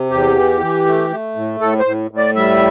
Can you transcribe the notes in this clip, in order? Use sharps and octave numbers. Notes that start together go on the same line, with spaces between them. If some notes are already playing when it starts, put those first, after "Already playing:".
Already playing: C3
E2 G4
E3
E3
A3
A3
A2
A2 A4
C5
A2
A2
D5
G3 E5